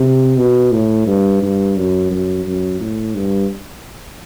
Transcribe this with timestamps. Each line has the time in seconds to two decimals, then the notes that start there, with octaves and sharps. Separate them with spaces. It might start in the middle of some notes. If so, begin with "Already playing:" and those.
Already playing: C3
0.38 B2
0.72 A2
1.06 G2
1.42 G2
1.77 F#2
2.11 F#2
2.45 F#2
2.80 A2
3.15 G2